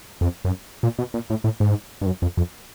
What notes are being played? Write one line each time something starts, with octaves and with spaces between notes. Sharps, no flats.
F2
F#2
A#2
B2
A#2
A2
A2
G#2
G2
F#2
F2
F2